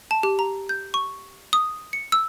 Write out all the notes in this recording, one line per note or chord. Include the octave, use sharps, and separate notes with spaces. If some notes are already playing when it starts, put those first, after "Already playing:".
A5
G4
A#5
G6
C#6
D#6
C#7
E6